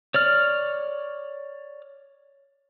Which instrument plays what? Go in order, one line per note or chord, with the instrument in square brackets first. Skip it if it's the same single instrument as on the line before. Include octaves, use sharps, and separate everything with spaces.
[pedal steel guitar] C#5 D5 F6